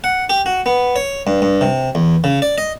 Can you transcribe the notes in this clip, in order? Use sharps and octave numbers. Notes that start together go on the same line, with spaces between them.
F#5
G4
F#4
B3
C#5
G2
G2
C3
E2
C#3
D5
D#5